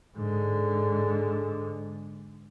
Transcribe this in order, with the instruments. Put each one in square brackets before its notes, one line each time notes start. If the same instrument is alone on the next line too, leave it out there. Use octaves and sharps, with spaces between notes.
[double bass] G#2 D3